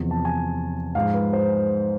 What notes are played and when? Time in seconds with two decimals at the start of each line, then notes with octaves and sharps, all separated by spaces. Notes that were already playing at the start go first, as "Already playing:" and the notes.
Already playing: E2 C3 F3
0.11 A5
0.25 G#5
0.95 G#2 F3 G#3 F5
1.14 B4
1.33 C5